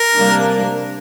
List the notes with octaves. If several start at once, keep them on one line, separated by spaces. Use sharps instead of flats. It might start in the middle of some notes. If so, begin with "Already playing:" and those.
Already playing: A#4
C3 G3 A#3 D4